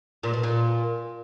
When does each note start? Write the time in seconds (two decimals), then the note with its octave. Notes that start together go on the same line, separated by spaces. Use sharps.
0.23 A#2
0.33 B2
0.43 A#2